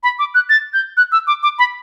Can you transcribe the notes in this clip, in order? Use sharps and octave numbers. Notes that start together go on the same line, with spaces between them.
B5
D6
F#6
A6
G6
F#6
E6
D6
D6
B5